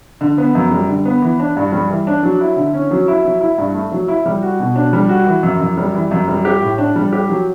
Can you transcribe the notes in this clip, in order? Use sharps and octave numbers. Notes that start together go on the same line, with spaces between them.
D3
B3
F#2
G3
D3
B3
E3
D4
G2
G3
E3
D4
F#3
E4
D3
C#4
F#3
E4
F#3
E4
G2
A3
F#3
E4
G3
F#4
B2
D4
G3
F#4
E3
F#2
F#2
G3
E3
F#2
G3
G4
A2
D4
G3
G4
F#3